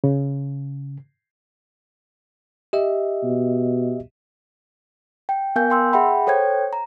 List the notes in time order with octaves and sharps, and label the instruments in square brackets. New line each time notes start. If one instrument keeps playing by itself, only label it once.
[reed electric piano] C#3
[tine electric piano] G4 D#5 E5
[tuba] B2
[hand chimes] G5
B3 A#4 F5 G#5 G6
G5 C6 E6
G#4 E5 F#5 G5 B5
A4 C5 C#5 G5 G#6
A#5